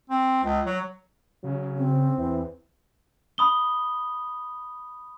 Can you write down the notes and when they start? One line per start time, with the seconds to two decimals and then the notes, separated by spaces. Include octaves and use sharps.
0.10 C4
0.43 C#2
0.66 F#3
1.44 C#3 F#3
1.77 C4
2.18 E2 E3
3.38 B5 D#6 G7